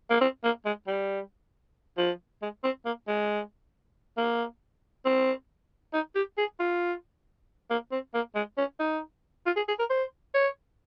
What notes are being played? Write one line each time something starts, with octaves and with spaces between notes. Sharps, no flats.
A#3
C4
A#3
G#3
G3
F3
G#3
C4
A#3
G#3
A#3
C4
D#4
G4
G#4
F4
A#3
C4
A#3
G#3
C#4
D#4
F4
G#4
G#4
A#4
C5
C#5